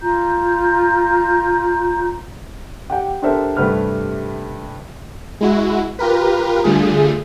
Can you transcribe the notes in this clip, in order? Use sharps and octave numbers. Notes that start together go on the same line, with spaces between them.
F4 A#5 G6
G4 F#5 G5
D4 G4 A4 A#4 C5 E5
G2 C3 A3 B4 C5 F6
G#3 E4 F#4
F4 G4 A#4 B4
D3 G3 A3 F4 G#4